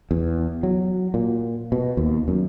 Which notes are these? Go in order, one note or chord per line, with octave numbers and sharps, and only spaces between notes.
E2
F#3
A#2
B2
D#2
F#2